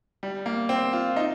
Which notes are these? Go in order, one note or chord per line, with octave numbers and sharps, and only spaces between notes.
G3
A#3
C4
F4
D#4